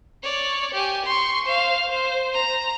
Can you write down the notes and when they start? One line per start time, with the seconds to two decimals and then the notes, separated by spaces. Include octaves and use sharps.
0.23 C#5 D5
0.74 G4 G#5
1.05 C6 C#6
1.46 C5 F5
1.88 C5
2.34 A#5